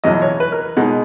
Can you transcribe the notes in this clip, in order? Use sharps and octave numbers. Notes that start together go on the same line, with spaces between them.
E2 B2 F#3 D#5
C#5
B4
A#4
B2 G#3 D#4 F#5